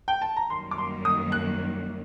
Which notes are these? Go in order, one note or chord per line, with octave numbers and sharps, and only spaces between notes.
G5
A5
A#5
F#2 D#3 G3 A#3 C6
D6
C6
D#6
F#6